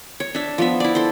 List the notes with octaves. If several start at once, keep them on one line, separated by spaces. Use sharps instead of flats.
C#5
D4 E5
F3 B3 E5
E4 D5
A4 C5